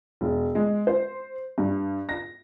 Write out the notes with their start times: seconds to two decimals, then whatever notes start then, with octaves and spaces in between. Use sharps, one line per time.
0.21 E1
0.55 G#3
0.87 C5
1.58 G2
2.09 A#6